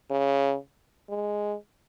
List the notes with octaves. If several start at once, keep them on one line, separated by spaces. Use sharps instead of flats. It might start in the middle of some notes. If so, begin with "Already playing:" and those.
C#3
G#3